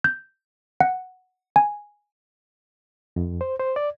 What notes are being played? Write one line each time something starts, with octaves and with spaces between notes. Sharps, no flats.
G6
F#5
G#5
F2
C5
C5
D5